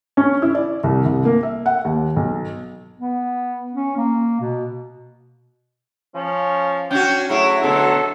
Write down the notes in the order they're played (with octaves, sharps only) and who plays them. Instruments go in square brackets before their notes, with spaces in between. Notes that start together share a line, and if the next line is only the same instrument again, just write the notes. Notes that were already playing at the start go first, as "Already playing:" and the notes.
[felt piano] C#4
E4
D5
C2
C2
A#3
E5
F#5
D#2
B1
[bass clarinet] B3
C#4
A#3
B2
[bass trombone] F3 [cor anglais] C#4
[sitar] C#4 D4 F#4 [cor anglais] G5
[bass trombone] F#3 [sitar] A3 E4 G#4 [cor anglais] C#5
[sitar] B2 D3 A3 [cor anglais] A4